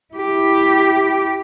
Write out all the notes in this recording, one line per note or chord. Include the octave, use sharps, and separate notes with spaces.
E4 G4